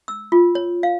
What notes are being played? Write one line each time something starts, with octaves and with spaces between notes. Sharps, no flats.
E6
F4
C#5
F5